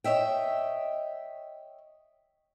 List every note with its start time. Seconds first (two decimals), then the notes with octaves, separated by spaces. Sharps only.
0.04 C#5 D#5 E5 G5